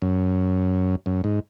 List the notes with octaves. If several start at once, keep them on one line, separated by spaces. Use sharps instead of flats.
F#2
F#2
G#2